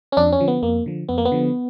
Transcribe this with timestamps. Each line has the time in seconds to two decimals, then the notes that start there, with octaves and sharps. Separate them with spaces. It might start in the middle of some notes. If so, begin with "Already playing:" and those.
0.12 C#4
0.17 F2 D4
0.32 C#4
0.40 D3 F3
0.48 B3
0.63 F2 A#3
0.86 D3 F3
1.09 F2 B3
1.18 A#3
1.25 B3
1.32 D3 F3